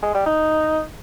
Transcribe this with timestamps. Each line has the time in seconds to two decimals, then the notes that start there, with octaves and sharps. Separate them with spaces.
0.02 G#3
0.14 G3
0.26 D#4